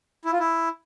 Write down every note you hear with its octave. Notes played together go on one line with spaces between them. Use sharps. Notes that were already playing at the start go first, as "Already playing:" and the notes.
E4
F4
E4